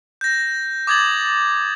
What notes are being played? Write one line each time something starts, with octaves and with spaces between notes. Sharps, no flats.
G6 A#6
D6 D#6 G#6 A6 F#7